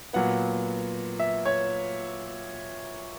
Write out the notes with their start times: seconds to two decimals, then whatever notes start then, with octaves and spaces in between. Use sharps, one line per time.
0.13 A#2 F#3 B3 F#5
1.20 E5
1.46 C#5